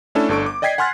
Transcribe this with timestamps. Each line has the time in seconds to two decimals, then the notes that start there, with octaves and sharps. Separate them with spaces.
0.15 A3 C#4 D4 E4 A4
0.29 G1 D4 A4 C#6 D7
0.46 D6
0.62 D5 D#5 G5 G#6 B6 C7
0.78 F#5 G#5 C6 F6 F#6 A6